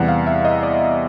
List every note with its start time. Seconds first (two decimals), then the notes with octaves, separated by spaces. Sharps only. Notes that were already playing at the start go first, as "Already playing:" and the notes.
Already playing: E2 C3 E3 G3 F#5
0.08 F5
0.27 E5
0.45 D#5
0.63 D5